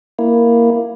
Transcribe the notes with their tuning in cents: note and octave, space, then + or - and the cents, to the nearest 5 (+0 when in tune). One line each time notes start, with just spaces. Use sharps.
A#3 +0 E4 +0